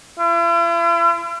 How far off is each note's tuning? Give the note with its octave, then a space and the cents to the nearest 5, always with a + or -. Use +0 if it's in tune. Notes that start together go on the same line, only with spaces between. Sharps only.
E4 +45